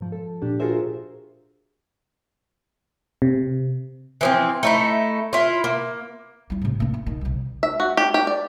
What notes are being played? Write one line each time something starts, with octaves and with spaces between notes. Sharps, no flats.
G#2 F3
A4
A#2 D4 G4
F4 F#4 G#4 A#4 C5 E5
C3
E3 F3 C4
A3 D#4 E4
E4 F4
A#3
G3 E4
A2 C3
A#3 C#4
E4
A#2 D#3
C2 C3
E5
F#4
G4
G4
D5